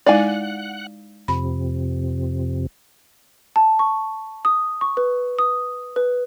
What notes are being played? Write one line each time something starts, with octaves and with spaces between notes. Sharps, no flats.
G#3 D#4 E4 D5 F5 F#5 G#5 F#6
F2 C3 B5
A5
C#6
D#6
C#6
B4
D#6
B4